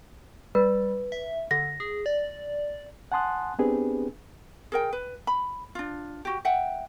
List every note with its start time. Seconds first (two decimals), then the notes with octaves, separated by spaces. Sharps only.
0.55 G3 B4
1.12 E5
1.51 D3 A#6
1.80 G#4
2.06 D5
3.12 F#5 G#5 A5 C6 D#6 F#6
3.59 B3 C4 D4 G4 G#4 B4
4.72 G#4 A#4 G5
4.93 B4
5.27 B5
5.75 D4 F4
6.25 F#4 G4
6.45 E5 F#5 G5